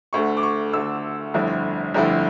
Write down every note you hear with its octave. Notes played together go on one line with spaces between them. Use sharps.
D2 D3 A3 C#6
D6
C#6
D2 D3 A3 E6
G1 F2 D3 A3 E4
G1 F2 D3 A3 E4